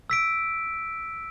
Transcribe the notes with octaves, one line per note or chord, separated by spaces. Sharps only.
E6 B6 D7